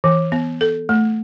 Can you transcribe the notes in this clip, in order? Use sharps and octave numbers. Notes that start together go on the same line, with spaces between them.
E3
B3
A4
A3